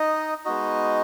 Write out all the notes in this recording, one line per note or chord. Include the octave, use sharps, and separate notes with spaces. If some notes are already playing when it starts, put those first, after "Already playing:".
Already playing: D#4 D#5
G#3 B3 D#4 F#4 D#5